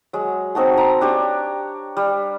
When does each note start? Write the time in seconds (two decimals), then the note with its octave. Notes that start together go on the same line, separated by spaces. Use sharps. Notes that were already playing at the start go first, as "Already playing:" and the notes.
0.13 F#3 G#3
0.55 C4 D#4 F#4 A5
0.77 A#5 C6
1.01 D4 G4 C#5
1.97 G3